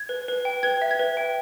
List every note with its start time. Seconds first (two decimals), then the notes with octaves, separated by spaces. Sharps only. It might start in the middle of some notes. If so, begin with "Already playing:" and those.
Already playing: G#6
0.09 B4
0.28 B4
0.45 G5
0.63 B4 G#6
0.82 E5
0.91 G#6
1.00 B4
1.17 G5